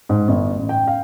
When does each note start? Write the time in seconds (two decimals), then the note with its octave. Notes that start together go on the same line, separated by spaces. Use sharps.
0.09 G#2
0.28 G1
0.55 A1
0.69 G5
0.88 F5